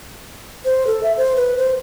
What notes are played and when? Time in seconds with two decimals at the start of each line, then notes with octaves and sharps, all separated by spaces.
0.65 C5
0.87 A4
1.03 E5
1.17 C5
1.37 B4
1.57 C5